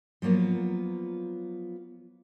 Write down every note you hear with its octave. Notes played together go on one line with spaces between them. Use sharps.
F3 F#3 A#3 B3 F4